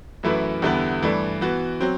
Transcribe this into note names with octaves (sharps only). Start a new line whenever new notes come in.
F#2 E3 A3 E4 B4
E2 D3 G3 B3 E4
G2 E3 A3 D4
E3 B3 F#4
F#3 C4